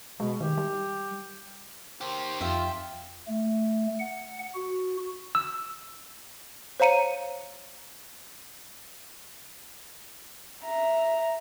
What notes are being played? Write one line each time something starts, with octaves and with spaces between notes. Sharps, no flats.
B2 G#3
D#3 G4
G3
D#3 G4 C5
F2 F4 E5 G5
A3
F#5
F#4
E6
C5 C#5 F5 A#5 C#7 D#7
E5 A#5